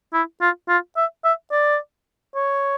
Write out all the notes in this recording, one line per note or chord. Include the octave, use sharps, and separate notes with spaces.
E4
F4
F4
E5
E5
D5
C#5